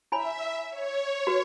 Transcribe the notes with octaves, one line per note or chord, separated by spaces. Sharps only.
E4 C#5 E5 G#5 B5
C#5
F#4 B4